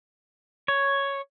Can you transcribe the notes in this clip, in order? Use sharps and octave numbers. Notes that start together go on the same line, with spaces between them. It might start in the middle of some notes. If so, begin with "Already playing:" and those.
C#5